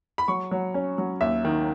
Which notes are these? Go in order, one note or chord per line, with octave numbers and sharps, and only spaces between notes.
B5
F#3 C#6
F#3
C#4
F#3
D#2 E5
D#3